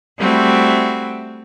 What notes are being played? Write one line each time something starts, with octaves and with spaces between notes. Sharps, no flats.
G3 A3 C4 E4 F#4